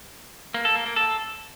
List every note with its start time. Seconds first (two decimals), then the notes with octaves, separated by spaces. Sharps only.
0.54 A#3
0.65 A4
0.75 A#3
0.86 A#3
0.96 A4